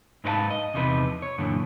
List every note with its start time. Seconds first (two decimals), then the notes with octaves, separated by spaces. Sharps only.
0.24 G#2 D#4 B4 C5 F5 A5
0.50 D#5
0.74 E2 C3 F3 D#4 B4
1.22 C#5
1.38 F#2 A#2 D3 E3